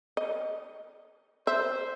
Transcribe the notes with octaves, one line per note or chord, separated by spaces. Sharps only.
D#5
C5 E5